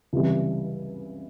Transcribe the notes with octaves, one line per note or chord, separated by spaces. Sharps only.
C#2 C3 E3 G3